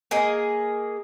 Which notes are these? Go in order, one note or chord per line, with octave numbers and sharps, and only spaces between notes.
A#3 G#4 D#5